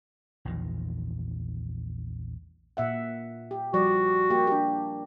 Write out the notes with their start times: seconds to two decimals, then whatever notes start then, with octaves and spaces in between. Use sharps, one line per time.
0.45 A#1 E2 A#2 D#3
2.77 A#2 E5 F#5
3.51 G4
3.74 F3 G3 F#4 D5
4.30 A#3 G4
4.47 D4 G4